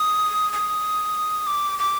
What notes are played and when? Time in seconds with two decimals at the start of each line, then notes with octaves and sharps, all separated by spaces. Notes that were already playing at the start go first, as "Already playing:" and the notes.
Already playing: D#6
0.53 D#6
1.47 D6
1.79 D6